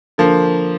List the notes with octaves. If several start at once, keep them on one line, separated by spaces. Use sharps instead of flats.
D3 F3 A#3